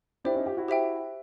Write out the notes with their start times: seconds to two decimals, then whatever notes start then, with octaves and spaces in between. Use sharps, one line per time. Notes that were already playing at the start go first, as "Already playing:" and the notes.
0.24 D4 E4 G4 C5 E5 G5
0.35 C#4 D#4
0.46 F4 G4
0.57 E4 F#4
0.68 G4 C5 E5 G5